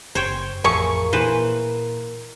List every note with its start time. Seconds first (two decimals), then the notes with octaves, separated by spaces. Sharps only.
0.15 F#1 C5 C#5 G5
0.64 A1 F2 F3 A3 G#4 A#4 C#6
1.13 A#2 E3 B4 C5